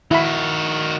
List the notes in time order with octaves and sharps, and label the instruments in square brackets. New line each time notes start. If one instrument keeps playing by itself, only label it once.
[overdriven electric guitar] D#3 F#4 [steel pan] E4 B5